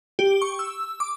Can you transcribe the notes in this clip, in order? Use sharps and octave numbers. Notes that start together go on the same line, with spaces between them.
G4
C#6
E6
D6